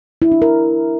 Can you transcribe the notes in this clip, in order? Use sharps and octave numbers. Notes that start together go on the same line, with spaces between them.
E4
D4
A#4